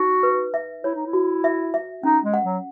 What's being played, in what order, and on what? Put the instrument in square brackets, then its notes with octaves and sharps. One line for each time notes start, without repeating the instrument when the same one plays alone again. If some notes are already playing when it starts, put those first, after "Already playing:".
Already playing: [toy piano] D#4 [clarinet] F#4
[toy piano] B4
E5
[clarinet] E4 [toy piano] C#5
[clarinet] D#4
E4
[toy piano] F#4
E5
E5
[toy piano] C#4 [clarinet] D#4
[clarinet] G#3
[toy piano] F#5
[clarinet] F#3